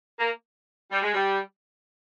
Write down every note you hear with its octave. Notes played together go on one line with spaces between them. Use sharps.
A#3
G3
G#3
G3